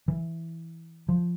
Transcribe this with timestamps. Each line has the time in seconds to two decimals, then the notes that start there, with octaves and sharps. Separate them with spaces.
0.08 E3
1.09 F3